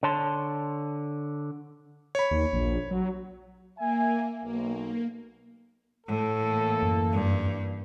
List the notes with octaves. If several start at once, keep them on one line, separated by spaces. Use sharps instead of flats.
D3 C#5 A5 C6
C#5 B5
D#2
A#1
F#3
A#3 E5 G#5
B1 A#3
A2 A4
E3 A#3
F#2
G2